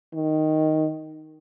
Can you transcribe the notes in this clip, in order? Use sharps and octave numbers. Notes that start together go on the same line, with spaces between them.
D#3